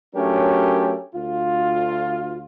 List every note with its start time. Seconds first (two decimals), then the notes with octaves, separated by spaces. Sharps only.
0.15 F#3 A3 C#4 D4 G4 A#4
1.15 D2 F4